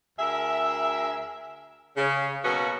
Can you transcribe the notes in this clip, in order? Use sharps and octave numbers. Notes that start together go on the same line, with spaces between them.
D2 G#4 A#4 E5
C#3
B2 F#3 A#3 B3 C#4 F#4